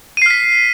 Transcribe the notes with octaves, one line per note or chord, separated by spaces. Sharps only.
F6 B6 C7 D#7